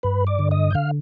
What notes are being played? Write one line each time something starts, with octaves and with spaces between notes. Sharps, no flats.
G2 B4 B5
D5 D6
D3
D#5 D#6
G6
D3 F5 F6